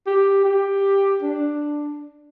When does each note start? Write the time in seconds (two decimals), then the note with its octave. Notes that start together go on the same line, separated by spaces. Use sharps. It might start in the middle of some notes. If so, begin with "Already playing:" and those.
0.07 G4
0.45 G4
1.22 D4